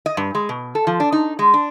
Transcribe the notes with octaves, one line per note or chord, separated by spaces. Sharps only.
D#5
G2
G#3
B2
A4
F3
D4
D#4
G#3
D4